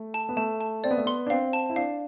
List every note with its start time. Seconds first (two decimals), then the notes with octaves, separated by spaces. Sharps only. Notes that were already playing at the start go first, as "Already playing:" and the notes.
Already playing: A3
0.14 A5
0.29 B3
0.37 A3 A5
0.61 A5
0.84 C4 D5
0.91 B3
0.98 A3
1.06 B3 C6
1.27 D4
1.30 C4 F5
1.53 A5
1.70 E4
1.76 D4 F5